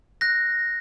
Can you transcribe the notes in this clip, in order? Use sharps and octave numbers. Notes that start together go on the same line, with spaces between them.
F#6 A#6